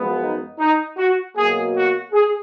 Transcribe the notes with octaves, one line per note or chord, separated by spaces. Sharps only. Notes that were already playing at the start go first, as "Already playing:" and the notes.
Already playing: F#2 F3 G#3 B3
D#4
D#4
F#4
B2 F#3 A#3 G#4
F#4
G#4